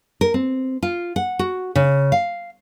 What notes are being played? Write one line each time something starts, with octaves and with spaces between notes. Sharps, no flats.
A#4
C4
F4
F#5
F#4
C#3
F5